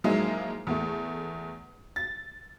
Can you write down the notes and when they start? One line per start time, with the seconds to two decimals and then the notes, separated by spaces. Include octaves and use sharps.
0.04 F3 F#3 G#3 A#3 D#4 E4
0.67 E2 A3
1.96 A6